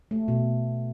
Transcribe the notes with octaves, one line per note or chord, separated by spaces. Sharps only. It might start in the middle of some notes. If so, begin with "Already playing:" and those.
A3
B2